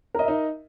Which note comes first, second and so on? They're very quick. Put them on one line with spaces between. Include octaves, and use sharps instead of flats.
A#4 D#5 E5 D#4